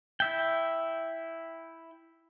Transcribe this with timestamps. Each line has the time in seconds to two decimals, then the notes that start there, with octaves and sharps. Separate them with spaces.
0.20 E4 E5 G5